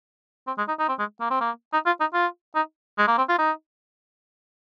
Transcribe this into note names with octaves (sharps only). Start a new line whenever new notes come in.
C4
G#3
D#4
D#4
C4
G#3
A#3
C4
A#3
D#4
F4
D#4
F4
D#4
G#3
A#3
C4
F4
D#4